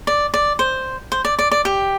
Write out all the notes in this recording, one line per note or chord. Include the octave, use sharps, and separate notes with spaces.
D5
D5
C5
C5
D5
D5
D5
G4